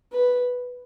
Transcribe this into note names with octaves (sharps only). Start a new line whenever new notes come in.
B4